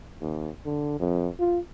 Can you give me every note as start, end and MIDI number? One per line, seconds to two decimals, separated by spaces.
0.21 0.49 39
0.66 0.97 50
1.00 1.28 41
1.39 1.59 65